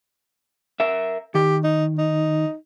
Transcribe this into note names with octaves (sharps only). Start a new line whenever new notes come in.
A#4 E5
D#3 G4
D#4
D#4